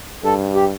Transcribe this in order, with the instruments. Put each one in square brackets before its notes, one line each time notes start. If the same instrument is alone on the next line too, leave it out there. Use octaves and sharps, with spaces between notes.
[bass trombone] G2 [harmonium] A4
[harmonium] G4